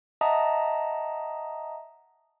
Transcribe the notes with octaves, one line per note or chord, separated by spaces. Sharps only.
D#5 E5 F#5 A5 A#5 D#6